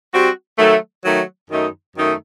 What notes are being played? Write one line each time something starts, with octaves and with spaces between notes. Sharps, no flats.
G3 C4 F#4
D#3 F#3 A3
D#3 F#3 A3
F#2 D#3 A3 D#4
F#2 D#3 A3 D#4